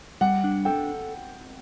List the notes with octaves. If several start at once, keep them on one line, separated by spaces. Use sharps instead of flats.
G3 F#5
D4
A4 G5